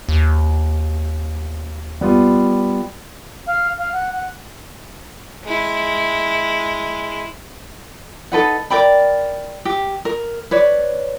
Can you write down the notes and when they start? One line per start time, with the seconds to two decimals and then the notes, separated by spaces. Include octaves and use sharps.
0.09 D#2
2.01 G3 B3 F4
3.47 F5
3.78 F5
3.93 F#5
4.13 F#5
5.44 G#3 E4
8.32 D#4 A4 B4 F#5
8.70 A#4 D5 G5 B5
9.65 G4
10.05 A#4
10.51 B4 C#5 D5